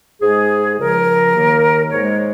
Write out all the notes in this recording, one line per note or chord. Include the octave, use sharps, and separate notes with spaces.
G#2 G#3 G#4
C#2 C#3 F3 A#4
D#2 D#3 A#3
G#2 G#3 C#5